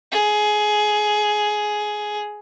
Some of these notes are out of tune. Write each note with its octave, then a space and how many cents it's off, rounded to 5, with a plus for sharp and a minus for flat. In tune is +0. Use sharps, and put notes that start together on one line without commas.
G#4 +15